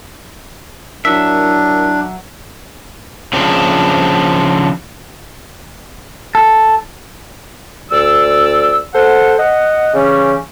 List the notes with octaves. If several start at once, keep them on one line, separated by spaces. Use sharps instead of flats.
F#3 D4 E4 A#4 E5
C#3 F3 C4 D4
A4
D2 D5 E6
A4 C5 F#5
D#5 F#5
C#3 E3 G3 C#4